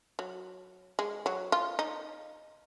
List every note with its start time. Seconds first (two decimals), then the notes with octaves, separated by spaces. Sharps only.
0.19 F#3
0.99 G#3
1.26 F#3
1.52 F4
1.79 D#4